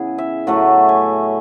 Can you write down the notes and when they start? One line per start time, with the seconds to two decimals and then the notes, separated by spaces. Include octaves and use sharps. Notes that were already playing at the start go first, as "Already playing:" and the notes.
Already playing: C#3 E3 B3 E4 G#4
0.18 E5
0.47 A2 F#3 A3 F#5
0.89 G#5